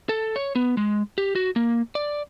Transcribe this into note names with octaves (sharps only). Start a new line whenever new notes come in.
A4
C#5
B3
G#3
G4
F#4
A#3
D5